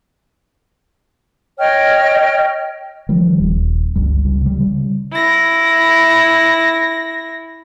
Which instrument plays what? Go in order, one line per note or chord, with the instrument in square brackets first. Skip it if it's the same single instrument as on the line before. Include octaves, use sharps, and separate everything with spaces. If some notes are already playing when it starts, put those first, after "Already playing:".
[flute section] C#5 D#5 G5 F6
[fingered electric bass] D#3 F3 G3
D#1
G1 C#2 G3
C#2
C#3 G3
C#3 G3
[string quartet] E4 A#6